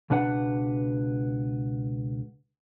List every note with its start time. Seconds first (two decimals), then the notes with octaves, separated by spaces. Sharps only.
0.10 C#2 B2 D4 B4 F#5